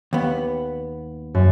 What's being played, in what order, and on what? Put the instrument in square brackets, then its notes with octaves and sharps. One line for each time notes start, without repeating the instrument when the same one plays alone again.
[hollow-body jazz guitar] D#2 B3
[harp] F#2